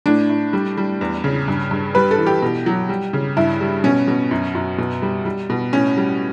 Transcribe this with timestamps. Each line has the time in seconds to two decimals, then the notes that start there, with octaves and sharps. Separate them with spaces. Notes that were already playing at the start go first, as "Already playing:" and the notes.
0.06 A2 D4
0.29 A2
0.53 G3
0.78 G3
1.01 E2
1.24 C#3
1.48 G2
1.71 G2
1.95 G3 B4
2.11 A4
2.18 E3
2.26 G4
2.42 B2
2.66 F#3
2.89 G3
3.13 C#3
3.37 G2 E4
3.61 G3
3.84 B2 C#4
4.08 B2
4.31 F#2
4.55 F#2
4.78 B2
5.02 G3
5.25 G3
5.50 B2
5.73 A2 C#4
5.97 G3